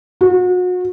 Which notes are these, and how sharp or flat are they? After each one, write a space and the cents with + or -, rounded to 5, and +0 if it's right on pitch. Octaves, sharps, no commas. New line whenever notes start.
F#4 -35